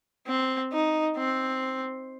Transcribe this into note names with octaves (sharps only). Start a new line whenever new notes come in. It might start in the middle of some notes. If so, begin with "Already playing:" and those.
C4
D#4
C4